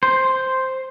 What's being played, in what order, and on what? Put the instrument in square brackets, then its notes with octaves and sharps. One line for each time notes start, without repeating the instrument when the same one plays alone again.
[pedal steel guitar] C5